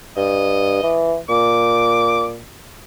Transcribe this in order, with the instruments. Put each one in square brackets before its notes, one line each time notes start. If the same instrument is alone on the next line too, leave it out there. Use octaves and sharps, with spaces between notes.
[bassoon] G2 [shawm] D#5
[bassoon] E3
[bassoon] A#2 [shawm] D6